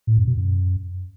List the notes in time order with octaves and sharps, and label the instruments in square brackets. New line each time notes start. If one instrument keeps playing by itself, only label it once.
[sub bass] A2
F#2
B2
F#2